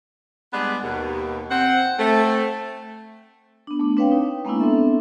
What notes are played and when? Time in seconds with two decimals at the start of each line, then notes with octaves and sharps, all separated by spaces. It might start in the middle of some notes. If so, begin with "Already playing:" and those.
0.53 G3 G#3 B3 D4 G#4 B4
0.83 D#2 B2
1.51 C4 F#5
1.98 A3 C4
3.67 B3 D4
3.80 A3 D4
3.97 C4 D4 B4 C#5 F5 G5
4.12 D#4
4.45 G#3 A#3 B3 C#4 D4 E4
4.60 B3 C4 D4 A4 E5